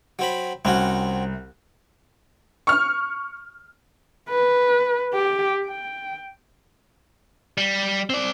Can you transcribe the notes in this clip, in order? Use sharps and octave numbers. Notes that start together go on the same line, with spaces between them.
F#3 C4 B5
C2 C4 C#4 F#4
C#6 F6
B4
G4
G5
G3
C4 D5